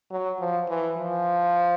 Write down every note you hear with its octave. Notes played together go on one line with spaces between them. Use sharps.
F#3
F3
E3
F3